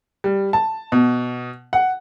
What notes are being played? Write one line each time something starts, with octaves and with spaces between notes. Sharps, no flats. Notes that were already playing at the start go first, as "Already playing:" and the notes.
G3
A5
B2
F#5